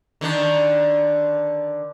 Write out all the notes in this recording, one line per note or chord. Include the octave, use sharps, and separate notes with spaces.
D3 D#3 D4